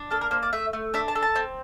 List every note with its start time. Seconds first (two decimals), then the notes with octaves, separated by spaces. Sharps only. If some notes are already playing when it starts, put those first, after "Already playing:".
Already playing: D4
0.10 A#3 A4
0.21 A#4
0.31 A#3 C5
0.43 D5
0.53 A3 E5
0.73 A3
0.94 D4 E5
1.08 A5
1.15 A4
1.23 A5
1.36 C4